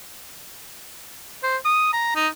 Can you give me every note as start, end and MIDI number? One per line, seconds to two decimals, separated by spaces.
1.43 1.57 72
1.65 1.89 87
1.93 2.12 82
2.16 2.28 63